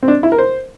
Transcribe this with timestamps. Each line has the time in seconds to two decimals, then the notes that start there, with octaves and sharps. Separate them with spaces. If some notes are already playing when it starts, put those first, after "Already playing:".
0.03 C4
0.08 D4
0.23 E4
0.32 A#4
0.38 C5